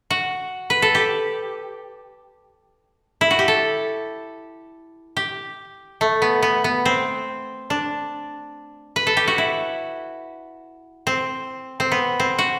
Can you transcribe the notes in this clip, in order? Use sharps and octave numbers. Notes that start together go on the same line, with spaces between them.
F#4
B4
A4
G4
E4
F#4
G4
A4
G4
A3
B3
B3
B3
C4
D4
B4
A4
G4
F#4
E4
C4
C4
B3
C4
F#4